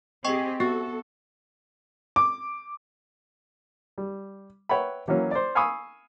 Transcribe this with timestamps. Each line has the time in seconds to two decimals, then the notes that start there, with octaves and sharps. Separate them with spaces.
0.25 C4 G4 G#4 D#5 G5 C#6
0.60 B3 F#4 A4
2.16 D6
3.98 G3
4.69 B4 C#5 E5 F#5 G5 B5
5.08 E3 F#3 A#3 C#4
5.31 C5 D5
5.55 F5 G#5 B5 C#6 D#6 E6